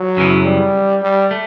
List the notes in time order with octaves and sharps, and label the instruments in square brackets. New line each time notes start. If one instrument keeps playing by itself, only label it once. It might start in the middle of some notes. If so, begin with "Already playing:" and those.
Already playing: [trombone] F#3
[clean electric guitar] F#2 C#3 E3 B3
[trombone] G3
G3
[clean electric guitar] A3